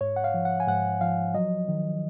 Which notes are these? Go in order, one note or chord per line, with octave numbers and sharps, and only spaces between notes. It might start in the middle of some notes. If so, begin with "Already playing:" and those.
G#2 C#5
F#5
F5
F3
F#5
G#5
G#2 F#5
F3 F5
F#3 D#5
D#3